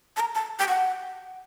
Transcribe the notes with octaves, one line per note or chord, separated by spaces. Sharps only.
A5
A#5
A5
G5
F#5